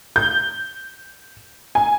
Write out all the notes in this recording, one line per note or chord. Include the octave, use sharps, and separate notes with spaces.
G6
G#5